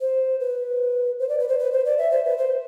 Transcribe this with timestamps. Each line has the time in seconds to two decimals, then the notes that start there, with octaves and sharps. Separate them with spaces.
0.01 C5
0.40 B4
1.19 C5
1.29 D5
1.39 B4
1.48 C5
1.59 B4
1.72 C5
1.85 D5
1.98 E5
2.11 C5
2.25 B4
2.38 C5